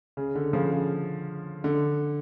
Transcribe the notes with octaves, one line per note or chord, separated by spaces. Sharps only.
C#3
D3
C#3 F3
C#3
D3